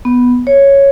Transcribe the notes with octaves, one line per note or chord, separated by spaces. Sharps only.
B3
C#5